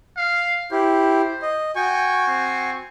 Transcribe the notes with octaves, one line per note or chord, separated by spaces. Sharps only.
F5
E4 G4 C5
D#5
F#4 G5 G#5 C#6
C4